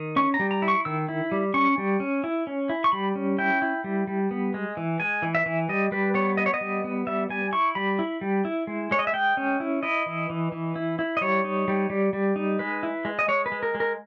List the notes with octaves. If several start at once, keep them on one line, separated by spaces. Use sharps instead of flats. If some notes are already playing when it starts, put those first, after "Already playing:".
Already playing: D#3
C#4 C#6
A#5
G3
A#5
E4
C#6
D#3 E6
E4
G3
C#4 C#6
G3
C#4
E4
C#4
E4
C#6
G3 B5
C#4
E4 G5
E4
G3
G3
B3
G#3
E3
G#3 G#5
E3
E5
E3
G3 D#5
G3 B4
B3 C#5
B3 D#5
C#5
D#5
G3
B3
G3 E5
G3 G#5
E4 C#6
G3 B5
E4
G3
E4
G#3
G#3 C#5
D#5
E5
G#3 G5
C#4
E4
E4 D#5
E3
E3
E3
E4
E4
D#5
G3 C#5
D#4
G3
G3
G3
D#4
G#3 B4
E4
G#3
D#5
G#3 C#5
B4
G#3
A#4
G#3
A#4